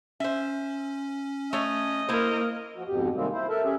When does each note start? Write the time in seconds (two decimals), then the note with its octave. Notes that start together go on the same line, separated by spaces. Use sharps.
0.20 C#4 C5 E5
1.53 A3 C#5 D#5
2.09 A#3 E4 A#4 C5
2.76 F3 F#4
2.88 F2 G#2 B2 G4
3.15 C3 D#3 G3 G#3 A#3 C4
3.32 E4 C5
3.49 A4 A#4 E5 A5
3.64 C#4 G4 G#4 E5